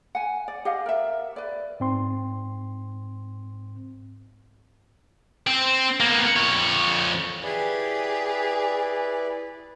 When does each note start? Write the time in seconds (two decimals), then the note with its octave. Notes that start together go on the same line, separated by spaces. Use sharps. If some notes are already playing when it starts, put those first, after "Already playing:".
0.15 F#5 G#5
0.48 D5
0.65 G4 D#5 F5 F#5
0.86 A#4 E5
1.36 B4 D5
1.80 G#2 C4 C6
5.47 C4
6.00 A#3 B3
6.36 F2 C#5
7.43 E4 G4 G#4 B4 D5